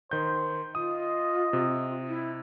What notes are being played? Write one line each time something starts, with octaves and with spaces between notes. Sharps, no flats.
D#3 C5 G6
F4 D#5 D#6
C3
E4